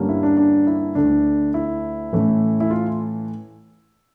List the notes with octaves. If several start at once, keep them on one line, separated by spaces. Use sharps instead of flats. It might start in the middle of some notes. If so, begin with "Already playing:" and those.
Already playing: G2 D3 G3 A#3 C#4
E4
D4
D4
E4
D2 D3 A3 D4
E4
A2 E3 A3 C#4
E4
F4